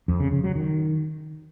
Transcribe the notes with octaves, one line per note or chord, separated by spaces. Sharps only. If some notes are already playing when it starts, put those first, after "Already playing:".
F2
C#3
C#3
F#3
D#3